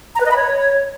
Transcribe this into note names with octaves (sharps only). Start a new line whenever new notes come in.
A#5
B4
D#5
B5
C#5